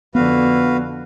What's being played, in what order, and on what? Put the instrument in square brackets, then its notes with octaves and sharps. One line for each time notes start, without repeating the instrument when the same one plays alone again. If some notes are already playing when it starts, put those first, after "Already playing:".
[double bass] F2 D3 [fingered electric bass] B3 [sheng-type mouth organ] F#4 B4 F5